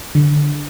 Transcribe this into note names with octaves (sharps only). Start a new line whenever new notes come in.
D3